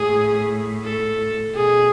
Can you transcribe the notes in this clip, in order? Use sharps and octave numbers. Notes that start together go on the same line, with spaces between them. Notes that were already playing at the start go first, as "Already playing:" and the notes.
Already playing: A2 G#4
A4
B2 G#4